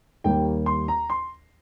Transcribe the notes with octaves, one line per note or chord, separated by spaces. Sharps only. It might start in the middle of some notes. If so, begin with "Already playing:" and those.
D#2 D#3 G3 A#3 G5
C6
A#5
C6